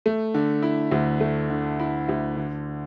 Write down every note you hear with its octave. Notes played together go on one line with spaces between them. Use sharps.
A3
D3
E4
D2
A3
D3
E4
D2
D3